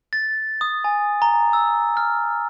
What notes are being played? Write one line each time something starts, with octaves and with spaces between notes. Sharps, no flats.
A6
D#6
G#5
A#5
E6
F6